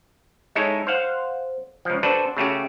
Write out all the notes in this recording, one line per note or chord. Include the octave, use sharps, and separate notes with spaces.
G#3 D#4 E4 A4 C#5
C5 F5 F#5
C#2 F3
D4 F#4 A4 B4 C5 D5
C#3 A3 F#4 G4